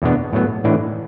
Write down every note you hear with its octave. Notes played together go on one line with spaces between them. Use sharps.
E2 B2 B3 D4
A2 F#3 B3
A2 E3 D4